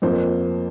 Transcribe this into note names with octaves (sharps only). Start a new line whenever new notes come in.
F2 F3 A#3 C5